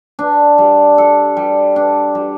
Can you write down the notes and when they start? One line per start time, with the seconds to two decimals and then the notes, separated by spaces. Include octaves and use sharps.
0.19 D4
0.58 G3
0.98 A4
1.37 G3
1.76 D4
2.15 G3